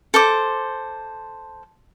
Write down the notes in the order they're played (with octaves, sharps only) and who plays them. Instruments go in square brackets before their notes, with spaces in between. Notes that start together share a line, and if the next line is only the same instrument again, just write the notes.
[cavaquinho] A4 C5 D6